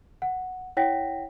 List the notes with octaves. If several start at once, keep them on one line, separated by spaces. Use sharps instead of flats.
F#5
E4 C#5 F#5 G5 A#6 B6